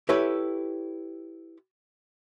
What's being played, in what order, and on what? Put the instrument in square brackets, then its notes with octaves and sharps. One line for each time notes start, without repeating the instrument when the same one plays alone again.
[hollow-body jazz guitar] E4 G4 A4 B4 C#5